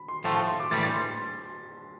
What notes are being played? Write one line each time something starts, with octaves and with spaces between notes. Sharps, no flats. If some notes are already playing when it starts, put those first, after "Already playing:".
Already playing: B5
C6
A2 F3 A3 A5
A5
C6
D6
A2 E3 G3 A6
A6
C6